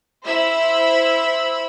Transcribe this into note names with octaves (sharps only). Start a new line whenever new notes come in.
E4 C5 E5 B5 E6